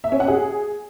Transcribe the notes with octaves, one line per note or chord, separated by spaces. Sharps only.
E5
C#4
F#5
G#4